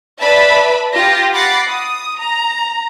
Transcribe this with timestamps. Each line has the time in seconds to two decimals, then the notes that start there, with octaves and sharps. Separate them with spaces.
0.20 B4 D5 E5 A5 B5
0.92 F4 G4 A#6
1.32 F#5 B5 D6 A6 A#6 C7
1.69 D#6
2.19 A#5